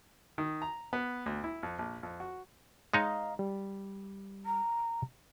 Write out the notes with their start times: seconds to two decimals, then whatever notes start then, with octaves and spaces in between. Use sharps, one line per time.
0.38 D#3
0.62 A#5
0.93 B3
1.26 D2
1.44 E4
1.63 F2
1.79 A#1
2.03 F2
2.20 F#4
2.94 G#3 D#4 C#5 D#5 F5 A#5
3.39 G3
4.46 A#5